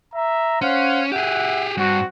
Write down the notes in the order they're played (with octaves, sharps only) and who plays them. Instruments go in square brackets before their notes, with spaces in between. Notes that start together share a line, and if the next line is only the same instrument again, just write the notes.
[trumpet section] E5 A#5
[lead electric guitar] C#4 [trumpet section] C5 F5 F#5
[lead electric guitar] G4 G#4 [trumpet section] E5 F#5
[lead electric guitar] G2 [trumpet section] C4 F#4